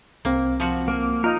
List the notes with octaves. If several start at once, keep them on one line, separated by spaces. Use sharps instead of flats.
C2 A#3 C4
F3 F#4
A#3
D#4 F4 A#4 D#5 F6